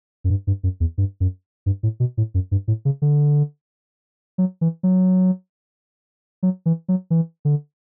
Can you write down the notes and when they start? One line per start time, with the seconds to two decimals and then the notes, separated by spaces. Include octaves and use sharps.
0.24 F#2
0.30 G2
0.47 G2
0.63 F#2
0.80 E2
0.98 G2
1.20 F#2
1.66 G2
1.83 A2
2.00 B2
2.17 A2
2.34 F#2
2.51 G2
2.68 A2
2.85 C#3
3.02 D3
4.38 F#3
4.61 E3
4.83 F#3
6.43 F#3
6.66 E3
6.88 F#3
7.10 E3
7.45 D3